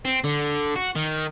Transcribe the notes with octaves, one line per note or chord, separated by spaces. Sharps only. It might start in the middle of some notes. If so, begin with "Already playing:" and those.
C4
D3
F#4
D#3